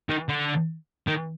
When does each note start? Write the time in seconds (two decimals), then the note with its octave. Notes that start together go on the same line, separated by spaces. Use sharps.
0.09 D#3
0.29 D3
1.08 D#3